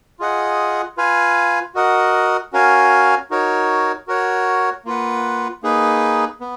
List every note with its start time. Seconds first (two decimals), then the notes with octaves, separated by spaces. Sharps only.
0.19 F4 G#4 D#5 F#5
0.97 F4 B4 F5 G#5
1.75 F#4 A#4 D#5 F#5
2.53 C#4 F#4 A#4 F5 G#5
3.30 D#4 F#4 A#4 C#5
4.08 F#4 A#4 C#5 F#5
4.85 A#3 F4 B4 F#5
5.63 A#3 D#4 G#4 B4
6.41 B3